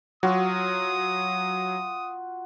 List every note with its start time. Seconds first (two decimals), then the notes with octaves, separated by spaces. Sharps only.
0.23 F#3 F4 F#4 D#6